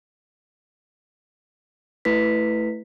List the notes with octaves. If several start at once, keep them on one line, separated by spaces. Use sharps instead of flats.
A3 E4 B4 B6